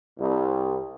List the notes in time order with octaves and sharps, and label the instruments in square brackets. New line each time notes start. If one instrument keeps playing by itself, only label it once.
[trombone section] C2